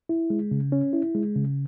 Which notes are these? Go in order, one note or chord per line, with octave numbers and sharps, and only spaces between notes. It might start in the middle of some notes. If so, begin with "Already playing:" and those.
E4
G#3
C#3
C#4
E4
G#3
C#3